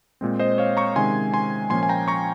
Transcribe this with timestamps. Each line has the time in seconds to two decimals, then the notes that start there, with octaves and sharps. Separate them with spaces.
0.21 A#2 G#3 C4
0.39 C5 D#5
0.58 C#5 F5
0.77 A#5 C#6
0.96 C3 D#3 G#3 C#4 G#5 C6
1.34 G#5 C6
1.70 A#2 F3 A#3 C#4 G#5 C6
1.83 G#5
1.89 G5 A#5
2.08 A#5 C#6